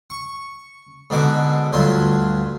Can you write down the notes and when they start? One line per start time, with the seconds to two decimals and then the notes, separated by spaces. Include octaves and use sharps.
0.10 C#6
1.10 G#2 B2 D3 F#4 D6
1.73 D2 G2 F#3 F4 C6